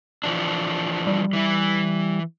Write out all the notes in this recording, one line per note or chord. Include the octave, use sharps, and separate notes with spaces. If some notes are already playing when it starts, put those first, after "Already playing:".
E3 F3 D4
G3
E3 E4